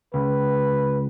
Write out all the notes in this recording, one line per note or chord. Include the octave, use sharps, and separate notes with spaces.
C#2 B4